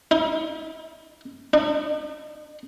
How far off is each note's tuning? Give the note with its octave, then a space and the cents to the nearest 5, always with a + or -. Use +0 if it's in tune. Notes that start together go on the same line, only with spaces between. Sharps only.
D#4 +45
D#4 -45